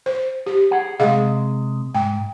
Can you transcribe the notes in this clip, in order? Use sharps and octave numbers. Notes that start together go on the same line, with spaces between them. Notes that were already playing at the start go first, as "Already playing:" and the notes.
C5
G4
G#4 F#5
C3 G#3 G#4 D#5 F5
G#2 G5